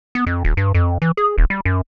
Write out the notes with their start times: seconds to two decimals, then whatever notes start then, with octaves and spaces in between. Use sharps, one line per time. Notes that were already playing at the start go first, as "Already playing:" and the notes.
0.15 B3
0.27 F2
0.45 D#1
0.57 G2
0.74 F2
1.02 E3
1.17 G#4
1.38 D#1
1.50 G3
1.65 F#2